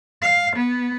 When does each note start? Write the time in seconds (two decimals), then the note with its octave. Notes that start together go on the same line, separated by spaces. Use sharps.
0.22 F5
0.56 B3